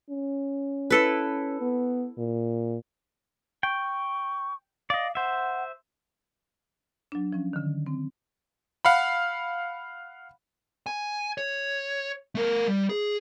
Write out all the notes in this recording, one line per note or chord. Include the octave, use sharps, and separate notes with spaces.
C#4
E4 A4 B4
B3
A#2
G5 C#6
D5 D#5 F5
C5 E5 F#5
F#3 D4
F3 C#4
D3 D#3
C4
F5 F#5 B5
G#5
C#5
A3 A#4
G3
G#4